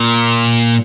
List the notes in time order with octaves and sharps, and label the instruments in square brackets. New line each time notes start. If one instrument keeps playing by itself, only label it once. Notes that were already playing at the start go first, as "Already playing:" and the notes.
Already playing: [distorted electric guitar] A#2